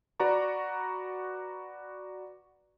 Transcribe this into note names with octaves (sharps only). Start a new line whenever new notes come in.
F#4 B4 D5 A#5 C#6